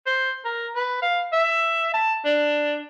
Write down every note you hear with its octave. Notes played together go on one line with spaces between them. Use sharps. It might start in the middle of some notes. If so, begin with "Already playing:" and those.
C5
A#4
B4
F5
E5
A5
D4